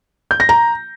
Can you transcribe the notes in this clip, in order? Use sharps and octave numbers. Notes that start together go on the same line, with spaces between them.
G6
A#6
A#5